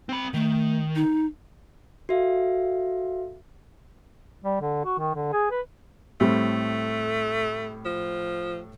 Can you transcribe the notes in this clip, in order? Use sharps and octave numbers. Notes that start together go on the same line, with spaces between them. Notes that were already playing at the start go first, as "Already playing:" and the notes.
C4 B5
D#3 A3
D#4
F#4 A4 E5 F5
G3
D3
F#4
D#3
D3
G#4
B4
A2 G3 A3 C4
F3